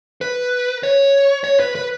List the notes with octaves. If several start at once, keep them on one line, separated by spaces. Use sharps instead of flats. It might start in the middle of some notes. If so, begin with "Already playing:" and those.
B4
C#5
C#5
B4
B4